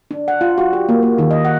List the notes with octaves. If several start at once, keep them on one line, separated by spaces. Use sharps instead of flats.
D4
F#5
F4
F#4
G4
A#3
A#3
D#3
D#5
F#5